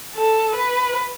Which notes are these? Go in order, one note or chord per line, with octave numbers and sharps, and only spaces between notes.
A4
B4